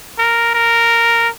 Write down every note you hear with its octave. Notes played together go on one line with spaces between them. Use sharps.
A#4
A#4